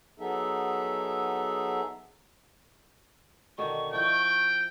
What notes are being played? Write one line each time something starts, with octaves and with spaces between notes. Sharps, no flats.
F#3 B3 D#4 G#4 A4 E5
B2 D3 D#3 C#6
F3 E4 G5